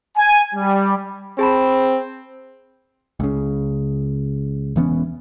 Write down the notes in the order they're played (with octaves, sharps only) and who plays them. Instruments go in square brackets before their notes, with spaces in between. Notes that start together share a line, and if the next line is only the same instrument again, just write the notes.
[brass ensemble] G#5
G3
[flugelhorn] C4 [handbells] G#4 A5 B5
[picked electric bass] C#2 C#3
E1 E3 B3 C#4